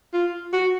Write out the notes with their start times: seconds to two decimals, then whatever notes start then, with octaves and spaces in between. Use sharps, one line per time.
0.13 F4
0.53 F#4